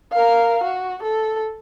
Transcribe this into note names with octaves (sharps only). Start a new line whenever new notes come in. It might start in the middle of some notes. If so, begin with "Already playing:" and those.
A#4 F5
F#4
A4